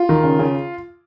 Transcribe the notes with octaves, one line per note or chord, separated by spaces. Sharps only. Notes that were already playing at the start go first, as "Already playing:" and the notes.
Already playing: F4
D#3
C#3
C#3